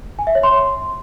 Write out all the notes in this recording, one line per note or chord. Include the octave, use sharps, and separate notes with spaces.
G#5
E5
C#5
C6